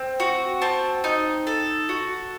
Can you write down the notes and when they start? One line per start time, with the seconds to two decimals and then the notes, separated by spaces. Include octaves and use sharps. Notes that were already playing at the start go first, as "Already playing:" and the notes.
Already playing: C4
0.20 F#4
0.62 C4 A5
1.04 D#4
1.47 A4
1.89 F#4